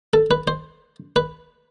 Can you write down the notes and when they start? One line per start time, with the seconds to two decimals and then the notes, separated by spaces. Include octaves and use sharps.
0.14 A4
0.31 B4
0.48 C5
1.16 B4